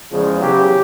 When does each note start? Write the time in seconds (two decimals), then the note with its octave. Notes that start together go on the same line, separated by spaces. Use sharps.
0.11 E2 C#3 F3 G#3
0.40 E2 C#3 F#3 G4